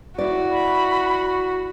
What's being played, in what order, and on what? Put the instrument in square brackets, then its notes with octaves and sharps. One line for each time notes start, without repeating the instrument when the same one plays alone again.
[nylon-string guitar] E4 D5 [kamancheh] F#4
[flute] B5